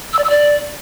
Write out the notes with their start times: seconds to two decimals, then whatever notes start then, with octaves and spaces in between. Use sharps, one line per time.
0.13 E6
0.19 D5
0.24 E6
0.30 D5